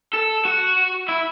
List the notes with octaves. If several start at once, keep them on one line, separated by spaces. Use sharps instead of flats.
A4
F#4
E4